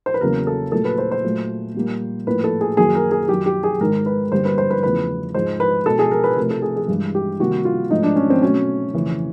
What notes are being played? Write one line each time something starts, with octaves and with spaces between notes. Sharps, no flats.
C5
B4
E2 C#3 F#3 A#3 A#4
A4
A#2 F#3 A3 A4
B4
C5
C5
A#2 F#3 A3
A#2 G3 A#3
A2 F3 A#3 B4
A4
G#4
F#2 D#3 F#3 A#3 G#4
A#4
G#4
F#2 D#3 F#3 G4
G4
G#4
G#2 D#3 G#3 A#4
B4
G2 D3 G3 A#3 C5
B4
C5
B4
E2 C#3 F3 A3 B4
G#2 F3 G#3 C5
B4
B2 G#3 A4
G#4
A#4
B4
C3 F3 A3 A#4
A4
G#4
G#4
G2 E3 G#3
G4
C3 D#3 G3 A#3 F#4
F4
G#2 F3 A3 D#4
D4
C#4
C4
B2 F#3 A3 C#4
F2 C#3 E3 A3